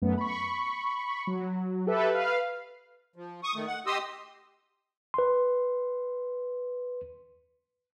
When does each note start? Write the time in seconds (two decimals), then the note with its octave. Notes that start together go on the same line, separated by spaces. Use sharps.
0.02 F#2 A3 B3
0.18 B5 C#6
1.27 F#3
1.87 G4 A4 B4 E5
2.10 B4 F5
3.16 F3
3.43 C#6 D#6
3.55 D#3 A3
3.67 F#5
3.86 G4 D#5 C6 D#6 E6
5.14 B4 C6